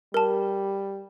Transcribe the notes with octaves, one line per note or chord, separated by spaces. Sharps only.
G3 A#4 A5